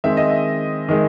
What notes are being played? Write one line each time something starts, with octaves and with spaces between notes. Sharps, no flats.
D#3 G#3 C4 E5
D#5
E5
D#3 G#3